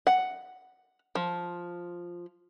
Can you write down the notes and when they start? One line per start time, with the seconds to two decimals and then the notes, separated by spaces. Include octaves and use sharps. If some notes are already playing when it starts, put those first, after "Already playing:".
0.07 F#5
1.15 F3